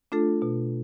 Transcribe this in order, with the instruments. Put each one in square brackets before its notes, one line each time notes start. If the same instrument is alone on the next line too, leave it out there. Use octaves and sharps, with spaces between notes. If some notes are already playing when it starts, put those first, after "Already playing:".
[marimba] A3 D4 F4 A4
B2